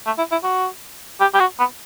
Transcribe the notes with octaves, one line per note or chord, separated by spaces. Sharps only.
A3
E4
E4
F#4
G4
G4
F#4
B3